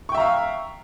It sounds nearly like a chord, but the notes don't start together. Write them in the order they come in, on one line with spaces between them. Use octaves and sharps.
C#6 G5 E5 A#5 F5